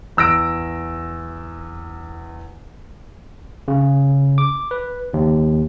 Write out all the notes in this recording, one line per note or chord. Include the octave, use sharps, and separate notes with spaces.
E2 E6 A#6 D7
C#3
D6
B4
D#2